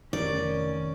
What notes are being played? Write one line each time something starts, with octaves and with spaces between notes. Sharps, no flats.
F1 D#3 C#4 D5